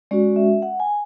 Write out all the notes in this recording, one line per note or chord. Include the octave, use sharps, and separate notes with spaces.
G#3 C#4 F#4 D5
E5
F#5
G#5